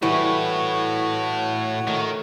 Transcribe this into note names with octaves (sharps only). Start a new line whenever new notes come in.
A2 E3 G3 F#4 B4 C#5
D#3 A3